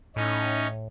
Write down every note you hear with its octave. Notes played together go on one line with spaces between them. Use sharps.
A2 C#4 D#4